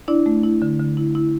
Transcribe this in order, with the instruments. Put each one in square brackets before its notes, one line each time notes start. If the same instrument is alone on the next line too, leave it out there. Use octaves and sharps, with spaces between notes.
[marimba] D4 E4 D5
A3
E4
D3
D3
E4
E4